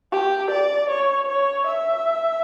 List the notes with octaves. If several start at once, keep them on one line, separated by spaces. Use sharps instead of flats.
G4
D5
C#5
C#5
E5